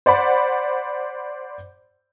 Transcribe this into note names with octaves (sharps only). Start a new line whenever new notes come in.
C5 D5 F#5 B5